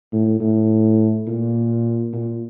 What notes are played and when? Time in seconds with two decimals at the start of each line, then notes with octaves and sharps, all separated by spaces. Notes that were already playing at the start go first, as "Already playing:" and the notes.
0.13 A2
0.40 A2
1.27 A#2
2.13 A#2